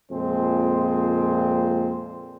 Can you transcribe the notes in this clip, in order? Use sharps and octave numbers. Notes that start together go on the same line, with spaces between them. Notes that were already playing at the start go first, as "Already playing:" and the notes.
F2 A#2 G#3 C4